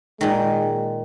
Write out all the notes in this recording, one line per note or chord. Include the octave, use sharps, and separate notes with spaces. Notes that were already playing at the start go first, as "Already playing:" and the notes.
A#2 D#3 G#3